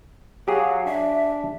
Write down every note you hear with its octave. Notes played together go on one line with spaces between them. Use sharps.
F#3 G4 G#4 F5
D4 E5